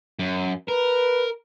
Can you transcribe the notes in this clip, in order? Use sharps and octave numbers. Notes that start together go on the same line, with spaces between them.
F#2
A#4 B4